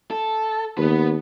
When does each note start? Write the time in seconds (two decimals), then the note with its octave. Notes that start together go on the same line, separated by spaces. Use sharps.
0.11 A4
0.78 D#2 B3 B4